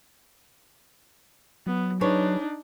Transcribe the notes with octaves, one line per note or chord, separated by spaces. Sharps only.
F#3 B3
D4 D#4 G#4 B4 C#5